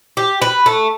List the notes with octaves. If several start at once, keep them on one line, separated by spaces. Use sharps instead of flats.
G4
B4
A3